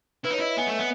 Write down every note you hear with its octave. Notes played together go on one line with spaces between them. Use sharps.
E4 B4
D#4 C#5
E4 D#5
E5
B3 G#5
A3
B3